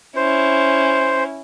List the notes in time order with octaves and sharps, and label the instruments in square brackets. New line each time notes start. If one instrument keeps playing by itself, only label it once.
[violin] C#4 E4 [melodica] C5